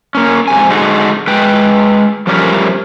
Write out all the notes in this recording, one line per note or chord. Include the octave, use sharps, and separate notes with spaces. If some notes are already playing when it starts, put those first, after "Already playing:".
A#3 C#4
G#2 C3 G#5
D3 G#3 D#4 F#4
G#3 B4 G5
F3 G3 A3 C#4 D4 A#4